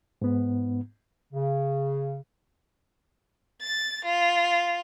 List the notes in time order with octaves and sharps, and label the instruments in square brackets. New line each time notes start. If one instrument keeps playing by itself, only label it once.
[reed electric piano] G#2 B3
[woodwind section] C#3
[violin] A6
F4